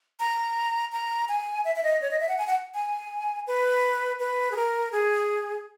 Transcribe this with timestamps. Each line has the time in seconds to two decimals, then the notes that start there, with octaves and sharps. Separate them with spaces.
0.20 A#5
0.92 A#5
1.29 G#5
1.65 E5
1.76 E5
1.83 D#5
2.02 C#5
2.11 D#5
2.20 E5
2.29 F#5
2.38 G#5
2.47 F#5
2.74 G#5
3.47 B4
4.19 B4
4.51 G#4
4.56 A#4
4.92 G#4